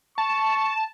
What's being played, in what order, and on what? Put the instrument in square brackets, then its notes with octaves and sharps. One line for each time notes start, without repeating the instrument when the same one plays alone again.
[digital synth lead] A5 [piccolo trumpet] C#6